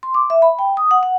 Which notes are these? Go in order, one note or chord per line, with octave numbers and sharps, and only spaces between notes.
C6
D6
E5
B5
G5
D#6
F#5
F#5